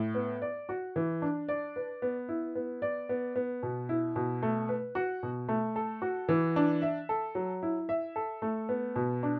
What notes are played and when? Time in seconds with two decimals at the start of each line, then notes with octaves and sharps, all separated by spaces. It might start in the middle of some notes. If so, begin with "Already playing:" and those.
Already playing: A2
0.15 B3
0.42 D5
0.69 F#4
0.96 E3
1.22 D4
1.49 D5
1.76 B4
2.02 B3
2.29 E4
2.55 B3
2.82 D5
3.09 B3
3.36 B3
3.63 B2
3.89 E4
4.16 B2
4.42 A3
4.69 B4
4.95 F#4
5.23 B2
5.49 A3
5.76 A4
6.02 F#4
6.29 E3
6.56 D4
6.82 E5
7.09 A4
7.35 F#3
7.63 E4
7.89 E5
8.16 A4
8.42 A3
8.69 B3
8.96 B2
9.23 D4